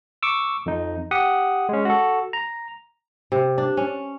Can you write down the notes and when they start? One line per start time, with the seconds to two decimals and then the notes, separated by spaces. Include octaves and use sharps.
0.23 C#6 D6 E6
0.66 F2 D#4
1.11 G4 F#5 D#6
1.69 G#3 C#4
1.85 F#4 A4
2.33 A#5
3.32 C3
3.58 D4
3.77 C#4